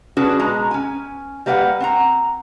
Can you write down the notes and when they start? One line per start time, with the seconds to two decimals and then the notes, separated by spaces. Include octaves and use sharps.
0.17 C#4 D4 F#4 G#4 B4
0.40 B2 G#3 A#5
0.71 C#4 G#5
1.46 G3 A#3 B4 D5 F#5
1.80 C4 F#5 A#5